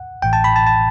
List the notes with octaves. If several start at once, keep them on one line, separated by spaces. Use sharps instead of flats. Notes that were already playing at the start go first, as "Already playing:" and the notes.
Already playing: F#5
A1 A2 E3 G5
A5
B5
A5
A5